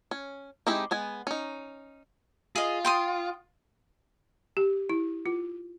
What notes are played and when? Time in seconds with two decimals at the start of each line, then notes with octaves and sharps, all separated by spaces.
0.11 C#4
0.67 G#3 C4 D#4 E4 G4
0.91 G#3 B3 G#5
1.27 C#4 D#4
2.56 F4 G#4 D#5
2.85 G5 C6 D#6
4.57 G4
4.89 E4
5.26 F4